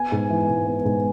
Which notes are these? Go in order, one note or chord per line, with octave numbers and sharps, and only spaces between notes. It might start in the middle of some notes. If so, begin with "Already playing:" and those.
Already playing: B3 G#5
G#2
E3
G#2
B3
G#2